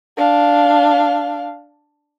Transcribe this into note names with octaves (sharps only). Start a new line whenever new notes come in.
D4 F5